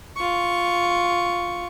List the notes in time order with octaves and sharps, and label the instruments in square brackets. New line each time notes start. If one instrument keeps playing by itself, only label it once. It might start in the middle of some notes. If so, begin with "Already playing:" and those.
[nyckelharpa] F4 C#6